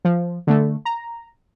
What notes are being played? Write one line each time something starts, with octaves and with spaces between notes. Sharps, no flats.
F3
D3 A3
A#5